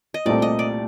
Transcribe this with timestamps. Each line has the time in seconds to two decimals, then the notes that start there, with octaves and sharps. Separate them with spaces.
0.14 D#5
0.26 C2 A#2 A3 C4 D5
0.42 D#5
0.59 D5